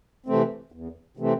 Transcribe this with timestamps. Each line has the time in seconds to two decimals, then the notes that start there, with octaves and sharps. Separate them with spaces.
0.26 C3 E3 A3 C4
0.72 E2
1.17 C3 E3 A3 C4